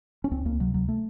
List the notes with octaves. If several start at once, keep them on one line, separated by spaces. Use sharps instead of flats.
C#4
C#2 C4
C#2 A#3
C3 F#3
C#2 F#3
A3